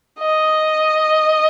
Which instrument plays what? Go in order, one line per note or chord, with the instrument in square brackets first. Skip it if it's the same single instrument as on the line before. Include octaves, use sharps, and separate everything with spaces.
[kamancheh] D#5